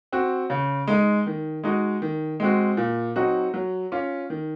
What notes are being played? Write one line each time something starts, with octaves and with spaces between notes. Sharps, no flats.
C4 F#4
C#3
G#3 D#4
D#3
G#3 D#4 F#4
D#3
G#3 C4 F#4
A#2
F#3 C4 D#4 F#4
F#3
C#4 F4
D#3